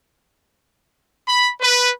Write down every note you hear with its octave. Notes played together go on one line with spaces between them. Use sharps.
B5
B4